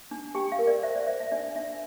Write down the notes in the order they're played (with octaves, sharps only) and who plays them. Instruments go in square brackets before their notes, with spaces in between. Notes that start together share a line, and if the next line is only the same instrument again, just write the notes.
[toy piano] D4
G4 G5
F5
A#4
D5
C5 E5
D5
C5 E5
E5
D4 D5
D4 E5